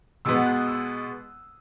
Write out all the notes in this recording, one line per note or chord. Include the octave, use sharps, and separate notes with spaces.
B2 G#3 B3 E6
F#6
E6